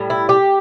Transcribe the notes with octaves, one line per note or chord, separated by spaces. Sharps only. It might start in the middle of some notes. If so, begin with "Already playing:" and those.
Already playing: A2 G3
E4
G4